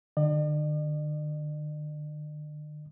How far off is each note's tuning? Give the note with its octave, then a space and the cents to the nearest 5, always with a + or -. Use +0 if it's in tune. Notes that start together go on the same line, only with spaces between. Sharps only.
D3 +40 D5 +45